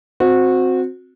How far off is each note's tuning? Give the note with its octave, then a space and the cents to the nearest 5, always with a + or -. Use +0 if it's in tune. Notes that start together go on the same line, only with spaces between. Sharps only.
C4 +0 F#4 -20